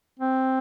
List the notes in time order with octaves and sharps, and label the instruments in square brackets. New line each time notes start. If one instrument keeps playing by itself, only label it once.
[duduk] C4